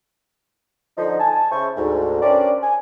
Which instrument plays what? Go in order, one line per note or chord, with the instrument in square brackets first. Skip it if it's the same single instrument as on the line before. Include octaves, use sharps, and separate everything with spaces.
[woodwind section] D3 F3 D#4
G#5 A5
C#3 E4 C5 C#6
D2 G#2
C#4 D4 G4 A#4 C5 D5
G#5